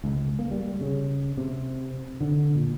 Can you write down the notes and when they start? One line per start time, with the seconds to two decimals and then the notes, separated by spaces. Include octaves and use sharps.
0.04 C#2
0.39 A#3
0.51 G3
0.81 C#3
1.37 C3
2.21 D3
2.55 A#2